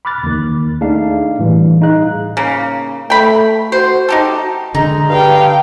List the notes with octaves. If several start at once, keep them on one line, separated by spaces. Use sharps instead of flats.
B5 D6 F6 F#6 A6
D#2 D#3
A3 D4 D#4 G#4 F5
A2 E3 G3
D#4 G#4 F5 F#6
C#3 A#3
A3 G5 B5
F#4 C5
D#4 G4 A4
D3 G#3 D#4
G2 F5 G5